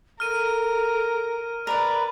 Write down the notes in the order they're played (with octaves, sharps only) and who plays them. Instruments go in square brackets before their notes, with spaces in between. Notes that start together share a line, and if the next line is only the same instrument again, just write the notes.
[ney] A4 [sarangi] A#4 [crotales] F6 D#7
[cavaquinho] A#4 B4 [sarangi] D5 [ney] B5